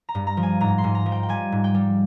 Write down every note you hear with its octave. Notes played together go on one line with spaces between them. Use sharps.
A#5
G2
A#5
F3
G#5
G#2 A#5
C6
G#2
A#5
F3
G5
G5
G3 G#5
G#2
G5
G3